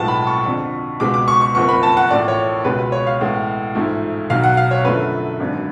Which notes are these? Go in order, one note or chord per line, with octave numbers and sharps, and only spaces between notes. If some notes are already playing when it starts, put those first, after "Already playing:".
Already playing: B1 A2 F3 G#3 B3 A5
B5
C#6
F2 D3 F3
C#2 B2 G#3 B3 D6
D6
C#6
C#6
F#1 F2 F3 B3 C#6
B5
A5
F#5
A1 A2 F3 D5
C#5
C#2 B2 G#3 B4
B4
C#5
F5
A1 A2 G#3 B3
A1 G#2 F3 A3
B1 B2 F#3 F5
F#5
F5
C#5
F#2 D3 F3 A3 B4
G#1 F#2 D3